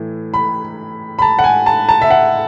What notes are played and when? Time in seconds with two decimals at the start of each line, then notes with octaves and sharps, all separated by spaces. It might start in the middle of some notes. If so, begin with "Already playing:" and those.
Already playing: A2 E3
0.34 B5
1.19 B5
1.22 A5
1.39 F#5
1.44 G#5
1.66 A5
1.89 A5
2.02 E5
2.10 F#5